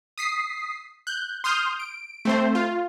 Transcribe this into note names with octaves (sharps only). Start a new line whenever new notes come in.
D#6 B6 C7
F#6 G6
C6 D#6 F6 G6
D7
A3 C4 C5
F4